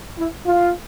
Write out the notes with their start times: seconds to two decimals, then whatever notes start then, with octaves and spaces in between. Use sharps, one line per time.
0.17 E4
0.45 F4